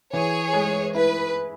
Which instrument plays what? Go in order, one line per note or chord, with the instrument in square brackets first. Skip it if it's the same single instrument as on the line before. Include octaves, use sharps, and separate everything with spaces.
[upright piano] E3 [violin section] G#4 C#5
[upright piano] G#3
[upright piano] E4 [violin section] B4